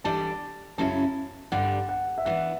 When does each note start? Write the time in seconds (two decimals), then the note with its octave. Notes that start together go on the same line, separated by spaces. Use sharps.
0.04 E3 G3 D4 A4 D5 A5
0.78 F#2 C#3 F#3 C#4 E4 A5
1.52 G2 D3 G3 D4 G4 F#5
1.89 F#5
2.18 E5
2.25 E3 B3 D4 F#5